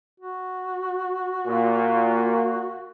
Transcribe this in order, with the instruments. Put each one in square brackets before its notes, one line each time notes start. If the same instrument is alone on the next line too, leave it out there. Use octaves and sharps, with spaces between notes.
[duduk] F#4
[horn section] A#2